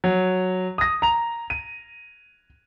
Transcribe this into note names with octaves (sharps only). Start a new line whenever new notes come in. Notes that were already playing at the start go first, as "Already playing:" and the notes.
F#3
D#6 A#6
A#5 F7
D#7